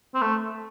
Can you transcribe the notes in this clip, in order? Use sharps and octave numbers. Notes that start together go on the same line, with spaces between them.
C4
A3